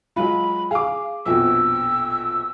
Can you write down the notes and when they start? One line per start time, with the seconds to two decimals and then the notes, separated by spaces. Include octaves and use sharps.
0.16 F#3 G#3 F4 B5
0.71 G#4 F5 D6
1.26 A#1 F2 B2 E6